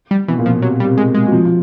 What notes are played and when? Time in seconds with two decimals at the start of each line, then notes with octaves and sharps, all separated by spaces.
0.11 G3
0.28 B2 E3
0.39 A#2
0.46 B2 F3
0.62 C3 F#3
0.80 G3
0.85 C3
0.98 G#3
1.15 G#3
1.27 F#3
1.32 F3
1.45 F3